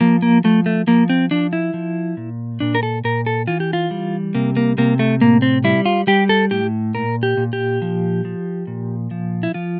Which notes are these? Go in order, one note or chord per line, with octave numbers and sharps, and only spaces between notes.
F3 A#3
A#3
F3 A3
A3
F3 A#3
C4
F3 D4
E4
F3
A#2
A#2 D4
A#4
A4
A#2 A#4
A4
E3 F4
G4
F4
G3
C3 A#3
A#3
C3 A#3
A3
A2 A#3
C4
G3 E4
F4
G3 G4
A4
A2 G4
A#2 A#4
G4
A#2
G4
F3
F3
A#2
F3
E4
F3 F4